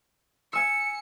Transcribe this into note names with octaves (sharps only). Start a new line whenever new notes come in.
G#5 E6 C#7